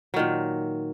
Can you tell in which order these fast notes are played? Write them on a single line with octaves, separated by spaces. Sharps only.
F#3 D#3 A#2